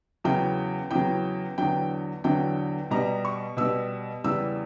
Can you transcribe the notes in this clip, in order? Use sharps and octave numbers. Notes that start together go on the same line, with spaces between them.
E2 C#3 F#3 G5
E2 C#3 F#3 G5
E2 D3 F#3 G5
E2 D3 F#3 G5
B2 G3 A#5
C#6
B2 G3 E6
E2 C#3 G3 E6